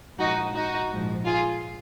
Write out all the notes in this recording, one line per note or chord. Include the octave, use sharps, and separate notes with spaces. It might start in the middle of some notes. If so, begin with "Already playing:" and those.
A#1 G#2 F3 D#4 F#4
D#4 F#4
A#1 G#2 F3
F4 G#4